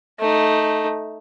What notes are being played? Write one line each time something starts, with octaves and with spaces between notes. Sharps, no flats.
A3 D#4